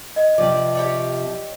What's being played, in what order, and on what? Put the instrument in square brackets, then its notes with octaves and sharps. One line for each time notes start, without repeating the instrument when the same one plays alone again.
[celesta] D#5
[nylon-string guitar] C3 F3 [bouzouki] D5
[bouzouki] G4 C#5 D5